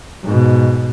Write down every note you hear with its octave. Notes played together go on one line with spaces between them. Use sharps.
G#2 B2